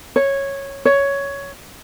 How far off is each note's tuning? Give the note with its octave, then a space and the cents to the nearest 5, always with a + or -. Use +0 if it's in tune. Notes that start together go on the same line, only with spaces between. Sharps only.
C#5 -10
C#5 +10